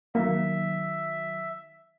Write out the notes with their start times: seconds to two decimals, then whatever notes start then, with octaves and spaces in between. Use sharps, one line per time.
0.15 D#3 F#3 A#3 E5